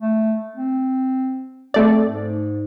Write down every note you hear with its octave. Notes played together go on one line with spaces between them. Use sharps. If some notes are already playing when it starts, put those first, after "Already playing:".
A3
C4
A3 C4 D5
G#2